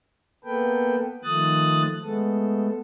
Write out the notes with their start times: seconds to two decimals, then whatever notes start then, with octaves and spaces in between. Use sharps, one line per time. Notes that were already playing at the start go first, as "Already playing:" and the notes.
0.45 A#3 B3 A4 B4 G5
1.24 D#3 F3 A3 D#6 F#6 A6
2.03 G#3 A3 B3 A4